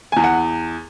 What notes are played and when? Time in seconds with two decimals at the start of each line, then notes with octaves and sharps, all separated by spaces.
0.12 E2 G#5
0.24 F#5